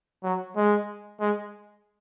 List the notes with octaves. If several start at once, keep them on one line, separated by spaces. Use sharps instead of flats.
F#3
G#3
G#3